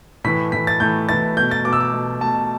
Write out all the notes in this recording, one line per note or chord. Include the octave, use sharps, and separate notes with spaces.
A2 E3 A3 B6
A2 E3 A3 B6
A6
A2 E3 A3 G6
A2 E3 A3 A6
B2 A3 G6
A6
B2 A3 D6
E6
D6
B2 A3
B2 A3 A5